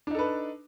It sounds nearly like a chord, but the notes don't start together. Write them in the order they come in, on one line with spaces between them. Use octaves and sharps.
D4 D#4 A4 B4